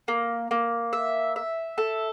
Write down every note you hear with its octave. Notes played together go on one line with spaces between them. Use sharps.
A#3
A#3
E5
E5
A4